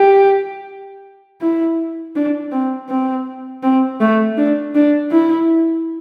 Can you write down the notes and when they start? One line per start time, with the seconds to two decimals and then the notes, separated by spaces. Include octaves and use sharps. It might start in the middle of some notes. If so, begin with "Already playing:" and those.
Already playing: G4
1.41 E4
2.15 D4
2.52 C4
2.89 C4
3.63 C4
4.00 A3
4.37 D4
4.75 D4
5.11 E4